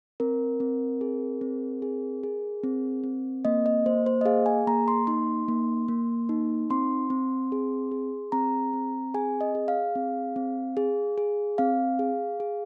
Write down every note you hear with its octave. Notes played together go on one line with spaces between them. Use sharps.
C4 A#4
C4
G#4
C4
G#4
G#4
C4
C4
A#3 D#5
D#5
A#3 C5
C5
D#5
G#4 F5
G#5
A#3 A#5
C6
D#4 C6
A#3
A#3
D#4
C4 C6
C4
G#4
G#4
C4 A#5
C4
G#4 G#5
D#5
G#4
F5
C4
C4
G#4
G#4
C4 F5
G#4
G#4